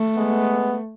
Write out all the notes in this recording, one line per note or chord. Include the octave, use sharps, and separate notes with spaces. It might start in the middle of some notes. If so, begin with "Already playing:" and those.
Already playing: A3
G#3 B3